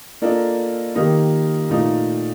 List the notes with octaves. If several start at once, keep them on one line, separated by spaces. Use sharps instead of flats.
A#3 D4 F4 A4 D#5
D#3 A#3 D#4 G4
A#2 A3 D#4